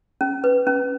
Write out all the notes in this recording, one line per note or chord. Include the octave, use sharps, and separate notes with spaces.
C#4
B4
C#4